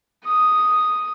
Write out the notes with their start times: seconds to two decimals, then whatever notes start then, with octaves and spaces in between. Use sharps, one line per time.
0.25 D#6